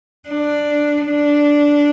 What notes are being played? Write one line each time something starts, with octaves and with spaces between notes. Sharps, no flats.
D4
D4